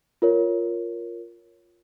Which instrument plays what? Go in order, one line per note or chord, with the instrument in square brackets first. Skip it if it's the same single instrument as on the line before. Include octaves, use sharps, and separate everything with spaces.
[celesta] F4 A#4 C#5